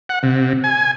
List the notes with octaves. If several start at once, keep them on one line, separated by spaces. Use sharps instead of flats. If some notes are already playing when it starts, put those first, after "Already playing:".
F#5
C3
G#5